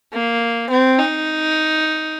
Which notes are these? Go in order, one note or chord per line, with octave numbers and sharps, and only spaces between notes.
A#3
C4
D#4